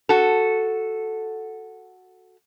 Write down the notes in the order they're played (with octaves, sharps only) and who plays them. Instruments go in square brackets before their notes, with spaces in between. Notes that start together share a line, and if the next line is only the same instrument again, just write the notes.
[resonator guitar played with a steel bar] F#4 A4